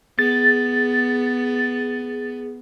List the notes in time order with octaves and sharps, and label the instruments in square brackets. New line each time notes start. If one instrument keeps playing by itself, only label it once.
[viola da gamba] B3 [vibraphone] G#4 [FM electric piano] A6